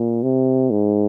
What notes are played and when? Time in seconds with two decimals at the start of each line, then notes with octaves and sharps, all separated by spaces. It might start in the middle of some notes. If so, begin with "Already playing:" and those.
Already playing: A#2
0.23 C3
0.71 G#2